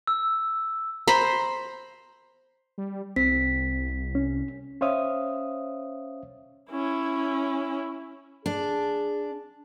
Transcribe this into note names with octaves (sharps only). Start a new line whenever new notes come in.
E6
C5 A#5 B5
G3
C2 C4 B6
C#4
C#4 C5 C#5 E5 F5 D#6
C#4 E4
D4 G#4